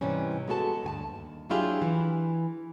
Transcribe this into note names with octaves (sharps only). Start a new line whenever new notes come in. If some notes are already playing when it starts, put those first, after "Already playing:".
G#2 C3 E3 G3 C#4
G#3 B3 F#4 A4 A5
D2 G2 G#5 A5
D#2
F#3 D4 E4 F4 G4 G#4
E3